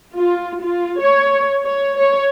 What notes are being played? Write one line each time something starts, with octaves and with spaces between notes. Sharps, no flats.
F4
F4
C#5
C#5
C#5